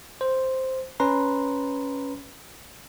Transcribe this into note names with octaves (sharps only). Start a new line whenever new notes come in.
C5
C#4 B4 A#5 C6